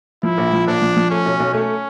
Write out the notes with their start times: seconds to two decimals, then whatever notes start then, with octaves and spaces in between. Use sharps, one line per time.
0.23 F3 E4
0.38 A#1
0.53 F3
0.67 A#1 D4
0.82 F3
0.97 F3
1.10 A3 C#4
1.26 B1
1.40 B1
1.53 A3 C#4